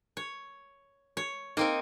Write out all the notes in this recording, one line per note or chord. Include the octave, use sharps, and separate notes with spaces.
C#5
C#5
A#3 C4 D#4 A#4